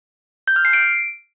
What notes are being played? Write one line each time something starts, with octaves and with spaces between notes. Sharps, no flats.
G6
F6
C7
D7